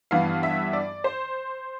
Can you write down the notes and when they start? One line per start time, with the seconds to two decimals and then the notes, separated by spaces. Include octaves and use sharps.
0.11 G2 E3 B3 F5
0.43 E5
0.73 D5
1.04 C5